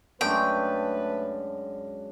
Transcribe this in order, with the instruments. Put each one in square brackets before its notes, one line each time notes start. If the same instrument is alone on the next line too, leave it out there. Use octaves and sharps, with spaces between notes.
[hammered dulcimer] F#2 G#3 D4 [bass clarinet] A3 [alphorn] B4 [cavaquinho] G5